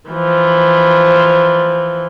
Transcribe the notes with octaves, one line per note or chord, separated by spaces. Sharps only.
E3 F3